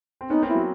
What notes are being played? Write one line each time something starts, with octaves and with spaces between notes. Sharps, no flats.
C4
B3 C#4 D#4
A#3 C4
E4
F#3